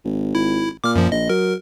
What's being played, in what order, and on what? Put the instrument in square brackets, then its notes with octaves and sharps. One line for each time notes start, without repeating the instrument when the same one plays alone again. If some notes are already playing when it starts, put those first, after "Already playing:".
[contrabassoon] G#1
[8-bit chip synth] E4
[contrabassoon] A#2 [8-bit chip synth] D6 F6
[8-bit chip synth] F#2 F3
[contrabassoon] A#1 [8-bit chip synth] D#5
[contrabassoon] F#3 [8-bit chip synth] A#4